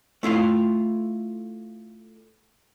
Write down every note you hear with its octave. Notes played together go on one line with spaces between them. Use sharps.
A3 E4 F4 F5